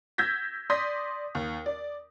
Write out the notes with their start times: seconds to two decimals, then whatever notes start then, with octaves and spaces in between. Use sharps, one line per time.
0.18 E6 G6 G#6 A#6 B6
0.70 D5 C6 D#6 G6 A#6 B6
1.35 D#2
1.66 D5